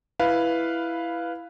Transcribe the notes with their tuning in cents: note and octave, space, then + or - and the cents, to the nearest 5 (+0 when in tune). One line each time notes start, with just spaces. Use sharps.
E4 +10 B4 +0 F5 +0